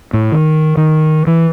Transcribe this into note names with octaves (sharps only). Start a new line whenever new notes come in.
A2
D#3
D#3
E3